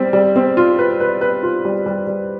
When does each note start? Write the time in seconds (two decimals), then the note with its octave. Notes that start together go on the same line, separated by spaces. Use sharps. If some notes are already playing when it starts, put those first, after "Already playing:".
Already playing: G3 C4
0.13 G3
0.36 C4
0.57 F4
0.79 B4
1.00 B4
1.21 B4
1.43 F4
1.65 G3
1.86 G3
2.07 G3